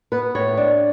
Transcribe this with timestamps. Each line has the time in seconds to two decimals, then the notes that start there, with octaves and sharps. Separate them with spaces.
0.12 B3 B4
0.35 A2 C#5
0.57 D4